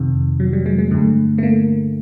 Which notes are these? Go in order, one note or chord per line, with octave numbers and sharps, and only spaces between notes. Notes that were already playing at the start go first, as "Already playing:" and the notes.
Already playing: F2 C3 D#3
F#3
G3
G#3
G#3
G2 D3 A3
A3
A#3